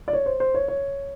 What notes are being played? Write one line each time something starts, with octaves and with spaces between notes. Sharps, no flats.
D5
C#5
C5
C5
C#5
C#5